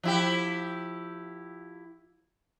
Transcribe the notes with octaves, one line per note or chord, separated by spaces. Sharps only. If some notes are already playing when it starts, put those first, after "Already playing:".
F3 E4 G4